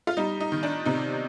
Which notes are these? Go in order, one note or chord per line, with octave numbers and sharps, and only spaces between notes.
F4
G3 D#4
D#4
D#3
D4
C3 D#4